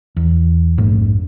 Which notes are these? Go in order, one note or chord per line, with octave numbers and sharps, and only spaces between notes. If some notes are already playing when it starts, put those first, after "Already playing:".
E2
A#1 F2 G#2 A3